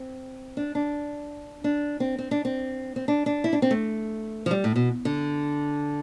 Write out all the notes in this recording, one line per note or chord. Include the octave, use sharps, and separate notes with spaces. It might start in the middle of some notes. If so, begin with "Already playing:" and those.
Already playing: C4
D4
D4
D4
C4
C4
D4
C4
C4
D4
D4
E4
D4
C4
A3
F3
G3
A2
B2
D3